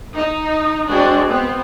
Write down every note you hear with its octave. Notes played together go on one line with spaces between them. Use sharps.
D#4
G#3 C4 D4 F#4
B3 C4